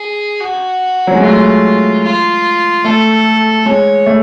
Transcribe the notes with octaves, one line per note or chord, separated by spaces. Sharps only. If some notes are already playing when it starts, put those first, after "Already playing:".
Already playing: G#4
F#4
F#3
G#3
A3 F4
F4
A3 A4
G#3 C#5
A3